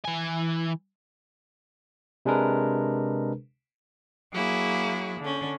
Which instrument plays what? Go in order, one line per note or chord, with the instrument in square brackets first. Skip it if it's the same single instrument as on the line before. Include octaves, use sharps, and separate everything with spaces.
[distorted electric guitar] E3 G#5
[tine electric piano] C3 G#3 D4 G#4 A#4 B4
[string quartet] F#3 A#3 E4 G#4
D3 C#4